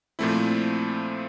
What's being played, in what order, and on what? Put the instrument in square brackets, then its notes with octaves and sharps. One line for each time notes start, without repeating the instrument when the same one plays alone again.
[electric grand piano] A#2 F3 A3 C4 E4